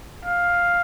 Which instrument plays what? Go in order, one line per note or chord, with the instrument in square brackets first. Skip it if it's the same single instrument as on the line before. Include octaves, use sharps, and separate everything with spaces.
[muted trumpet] F5